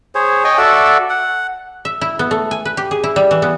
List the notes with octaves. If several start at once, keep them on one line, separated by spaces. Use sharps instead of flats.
G#4 C5 C#5
C#5 D#5 G5 G#5
F#4 A4 D5 E5
F#5
E5
E4
B3
A3
G#5
B4
G4
G#4
E4
G3
E3
B3